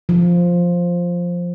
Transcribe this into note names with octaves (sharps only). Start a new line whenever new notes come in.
F3